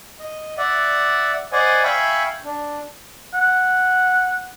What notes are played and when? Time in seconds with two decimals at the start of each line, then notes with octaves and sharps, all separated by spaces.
0.20 D#5
0.58 D5 E5 F#5
1.52 C5 D5 D#5 F#5 G#5
1.84 E5 F5 G5 G#5 B5 C#6
2.45 D4
3.34 F#5